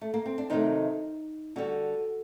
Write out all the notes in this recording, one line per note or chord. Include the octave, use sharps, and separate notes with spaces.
A3
A#3
C4
D4
C3 D#3 F#3 A3 D#4
D3 G3 F#4